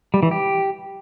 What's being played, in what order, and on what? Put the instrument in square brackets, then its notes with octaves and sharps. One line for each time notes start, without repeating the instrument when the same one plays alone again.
[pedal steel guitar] G3
E3
G4